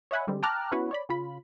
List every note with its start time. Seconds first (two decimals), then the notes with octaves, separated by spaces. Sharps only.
0.11 C#5 D#5 E5 F#5 G#5 B5
0.27 D3 G3 G#3 C4
0.43 G5 A5 A#5 D6 F6 F#6
0.71 B3 C#4 E4 F#4 B4 C#5
0.91 C#5 D5 B5
1.09 C#3 F4 B5